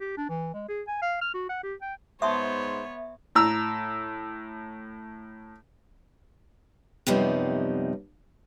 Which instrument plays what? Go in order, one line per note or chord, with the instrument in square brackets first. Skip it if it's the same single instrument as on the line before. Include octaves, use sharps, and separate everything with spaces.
[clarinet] G4
D4
E3
G#3
G#4
G#5
F5
F6
F#4
F#5
G4
G5
[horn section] G#2 C5 [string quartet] B3 C#5 [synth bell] E5 [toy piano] A5 C6 D#6
[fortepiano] A2 A#5 E6
[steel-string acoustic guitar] F#2 C3 F3 G3 B3 D#4